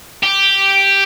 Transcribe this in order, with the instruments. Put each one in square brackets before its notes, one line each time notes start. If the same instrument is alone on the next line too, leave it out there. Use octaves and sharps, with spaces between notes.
[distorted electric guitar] G4